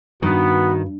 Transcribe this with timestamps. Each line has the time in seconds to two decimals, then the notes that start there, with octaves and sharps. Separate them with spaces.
0.22 G2 D#3 B3 F#4